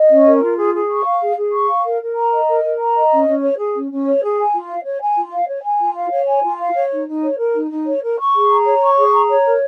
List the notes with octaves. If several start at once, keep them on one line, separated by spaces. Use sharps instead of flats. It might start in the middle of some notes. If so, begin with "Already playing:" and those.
Already playing: D#5
C#4
A#4
F4
G#4
G#4
C#6
F5
G#4
G#4
C#6
F5
A#4
A#4
A#5
D#5
A#4
A#4
A#5
D#5
C#4
C#4
C#5
G#4
C#4
C#4
C#5
G#4
G#5
F4
F5
C#5
G#5
F4
F5
C#5
G#5
F4
F5
C#5
G#5
F4
F5
C#5
D#4
D#4
C#5
A#4
D#4
D#4
C#5
A#4
C#6
G#4
A#5
C#5
C#6
G#4
A#5
C#5
A#4